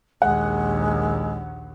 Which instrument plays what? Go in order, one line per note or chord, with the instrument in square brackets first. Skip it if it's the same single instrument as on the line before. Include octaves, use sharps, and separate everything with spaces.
[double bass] A#1 D#2 [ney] G#3 [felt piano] F#5